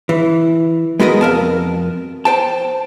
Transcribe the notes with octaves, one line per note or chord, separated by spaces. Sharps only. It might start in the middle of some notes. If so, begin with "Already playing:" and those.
E3
G#3 B3 F#4 A#4 C5 D#5
F2 A#4 A5
C5 G5 A5